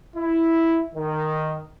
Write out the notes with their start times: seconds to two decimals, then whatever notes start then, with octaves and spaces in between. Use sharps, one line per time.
0.16 E4
0.95 D#3